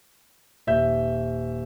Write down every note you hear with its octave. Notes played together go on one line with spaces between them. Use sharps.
D#1 E5 G6